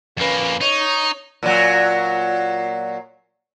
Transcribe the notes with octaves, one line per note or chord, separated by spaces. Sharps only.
F2 A#3 C#4 B4
D#4 C#5
A#2 F#3